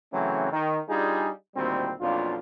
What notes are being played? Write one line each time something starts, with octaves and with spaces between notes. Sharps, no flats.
C#3 E3 F#3 A3 C4 C#4
D#3
G3 D4 D#4 F4 G#4
D2 A#2 D#3 G3 C4
B1 F2 A#3 D4 F4